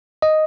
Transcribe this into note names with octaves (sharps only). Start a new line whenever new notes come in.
D#5